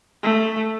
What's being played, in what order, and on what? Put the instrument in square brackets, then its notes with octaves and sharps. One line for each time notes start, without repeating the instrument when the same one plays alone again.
[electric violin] A3